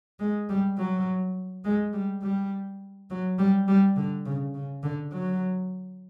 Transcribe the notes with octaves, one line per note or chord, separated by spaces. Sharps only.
G#3
G3
F#3
G#3
G3
G3
F#3
G3
G3
D3
C#3
C#3
D3
F#3